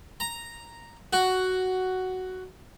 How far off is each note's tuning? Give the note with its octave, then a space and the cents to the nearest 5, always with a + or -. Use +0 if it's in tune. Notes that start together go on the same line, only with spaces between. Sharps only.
A#5 +0
F#4 +5